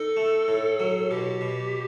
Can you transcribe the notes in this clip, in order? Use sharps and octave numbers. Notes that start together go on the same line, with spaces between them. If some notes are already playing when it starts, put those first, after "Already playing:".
Already playing: D#4 A4
A3
A2
F#3
B2 G4
B2